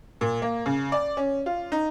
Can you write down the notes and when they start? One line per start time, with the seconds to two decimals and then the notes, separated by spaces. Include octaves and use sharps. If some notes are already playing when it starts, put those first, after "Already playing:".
0.21 A#2
0.42 A#3
0.66 C#3
0.92 D5
1.17 C#4
1.46 F4
1.72 D#4